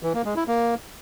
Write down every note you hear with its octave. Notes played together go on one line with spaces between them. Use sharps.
E3
A#3
G#3
E4
A#3